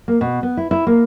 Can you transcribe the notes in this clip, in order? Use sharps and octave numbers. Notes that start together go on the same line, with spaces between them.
A#3
B2
B3
E4
E4
A#3